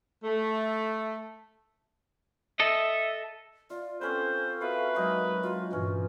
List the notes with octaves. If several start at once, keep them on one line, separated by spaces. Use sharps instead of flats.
A3
A4 D#5 E5
F4 D5
C4 C#4 A4 B4 C5
F#4 A#4 B4 E5 F5
F#3 G#3 A#3 D#4 F#4 A#5
F4 F#4
G2 A#2 E3 C#4